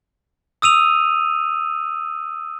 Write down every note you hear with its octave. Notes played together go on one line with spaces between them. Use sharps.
D#6 E6 D#7 F7